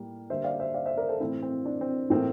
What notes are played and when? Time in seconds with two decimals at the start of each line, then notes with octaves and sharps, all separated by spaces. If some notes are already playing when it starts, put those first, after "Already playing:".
Already playing: A2 G3 A#3
0.30 D3 G3 A#3 C5 E5
0.44 D5 F5
0.60 C5 E5
0.74 D5 F5
0.86 C5 E5
0.97 A#4 D5
1.08 A4 C5
1.20 A2 E3 A3 C4 E4
1.43 C4
1.65 D4
1.81 C4
2.10 A2 E3 A#3 C4